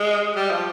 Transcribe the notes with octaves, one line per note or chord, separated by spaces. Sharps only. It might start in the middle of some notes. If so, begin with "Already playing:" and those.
Already playing: G#3
G3
F3